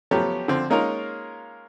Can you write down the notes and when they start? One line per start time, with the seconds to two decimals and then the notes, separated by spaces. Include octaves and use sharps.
0.11 F3 F#3 A3 B3 C#4 G4
0.48 D3 F3 C4
0.70 G#3 A#3 C#4 D#4 F4 A#4